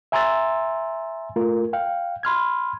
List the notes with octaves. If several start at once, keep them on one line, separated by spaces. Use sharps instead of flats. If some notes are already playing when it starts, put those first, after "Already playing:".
E5 G#5 A#5 C6 E6 A6
A3 F4 A#4
F5 G5
B5 C6 F6 G#6